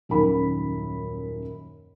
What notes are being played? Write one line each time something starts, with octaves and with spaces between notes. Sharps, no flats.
D#1 F#2 D#3 D#4 A#4 B5